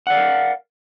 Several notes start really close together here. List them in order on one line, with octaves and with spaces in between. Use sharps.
F#5 D5 F5 A#4